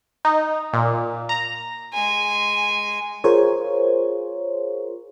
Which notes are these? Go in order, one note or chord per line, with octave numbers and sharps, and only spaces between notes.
D#4
A#2
A#5
G#3 G#5
F4 G#4 A#4 C5 C#5